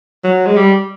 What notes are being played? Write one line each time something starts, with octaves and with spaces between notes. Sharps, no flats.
F#3
G#3
G3